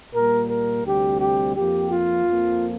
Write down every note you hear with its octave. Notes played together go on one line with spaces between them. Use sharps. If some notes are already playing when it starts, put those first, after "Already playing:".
A#2 G3 A#3 A#4
A#4
D2 C3 G3 C4 G4
G4
F2 F3 A#3 G4
F4
F2 F3 A#3